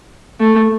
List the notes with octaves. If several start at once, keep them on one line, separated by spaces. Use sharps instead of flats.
A3